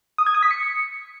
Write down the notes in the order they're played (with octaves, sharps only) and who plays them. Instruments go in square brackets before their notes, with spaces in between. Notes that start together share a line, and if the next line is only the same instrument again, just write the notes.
[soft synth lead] D#6
G#6
D#6
B6
C#7